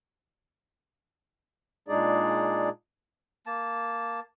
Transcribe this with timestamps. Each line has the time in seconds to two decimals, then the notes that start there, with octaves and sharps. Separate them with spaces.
1.88 A#2 G#3 D4 D#4 G#4 D5
3.46 A#3 A5